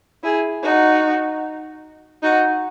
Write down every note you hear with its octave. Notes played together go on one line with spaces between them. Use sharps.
E4 G#4
D#4 F#4
D#4 F#4